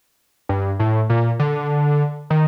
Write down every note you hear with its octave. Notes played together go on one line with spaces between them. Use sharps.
G2
A2
A#2
D3
D#3